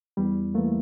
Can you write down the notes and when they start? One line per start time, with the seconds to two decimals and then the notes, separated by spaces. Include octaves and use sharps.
0.17 E2 G3
0.54 E3 A3 A#3